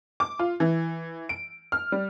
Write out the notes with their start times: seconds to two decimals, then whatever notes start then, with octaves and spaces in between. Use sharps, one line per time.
0.20 D6
0.39 F4
0.60 E3
1.29 D7
1.72 F6
1.92 G3